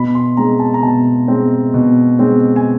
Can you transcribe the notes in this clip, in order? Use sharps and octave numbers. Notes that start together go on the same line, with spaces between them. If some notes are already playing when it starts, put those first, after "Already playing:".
Already playing: B2 B5
C6
G#3 C4 A#5
A5
A#5
B2 A5
G#3 C4
B2
G#3 C4
G#5